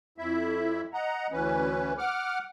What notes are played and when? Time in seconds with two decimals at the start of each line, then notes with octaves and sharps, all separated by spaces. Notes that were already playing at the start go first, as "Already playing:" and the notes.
0.18 F2 E4 E5
0.94 D#5 F#5 A#5
1.32 D2 E3 C#4 B4
1.98 F#5 D6 F6